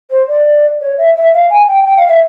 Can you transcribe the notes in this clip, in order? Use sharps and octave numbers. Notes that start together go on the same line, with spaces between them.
C5
D5
C#5
E5
E5
F5
G#5
G5
G5
F5
E5